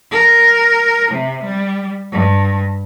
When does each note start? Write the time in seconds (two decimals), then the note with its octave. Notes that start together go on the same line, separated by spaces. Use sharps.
0.11 A#4
1.11 C3
1.44 G3
2.12 G2